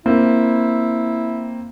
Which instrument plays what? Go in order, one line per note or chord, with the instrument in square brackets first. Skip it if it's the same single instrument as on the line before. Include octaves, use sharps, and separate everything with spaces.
[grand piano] A#3 C4 [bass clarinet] E4